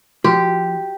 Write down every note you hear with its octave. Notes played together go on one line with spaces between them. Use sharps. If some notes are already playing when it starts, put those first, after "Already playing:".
F3 F#4 G4